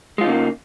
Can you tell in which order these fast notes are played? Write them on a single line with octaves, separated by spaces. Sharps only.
G#3 F4 D#4 C#3 A#3